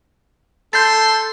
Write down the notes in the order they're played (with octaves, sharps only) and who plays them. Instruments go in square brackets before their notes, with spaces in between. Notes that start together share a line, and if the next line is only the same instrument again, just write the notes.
[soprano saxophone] A4 [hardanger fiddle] C6 [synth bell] G6 A6